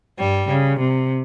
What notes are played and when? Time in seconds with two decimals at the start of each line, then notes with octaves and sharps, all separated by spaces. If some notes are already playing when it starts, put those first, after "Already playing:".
0.19 G2 G3
0.49 C#3
0.79 C3